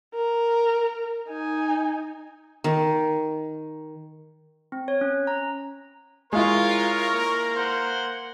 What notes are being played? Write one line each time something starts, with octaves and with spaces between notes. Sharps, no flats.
A#4
D#4 G#5
D#3
C4
C#5
C#4
A#5
G#3 E4 F4 A#4 C#5 F5
A#3
C5 F#5